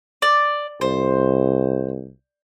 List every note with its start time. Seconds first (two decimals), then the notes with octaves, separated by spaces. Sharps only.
0.22 D5
0.81 C2 C5